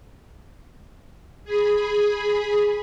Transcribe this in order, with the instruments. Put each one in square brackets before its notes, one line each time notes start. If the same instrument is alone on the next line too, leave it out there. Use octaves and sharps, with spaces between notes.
[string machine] G#4 B5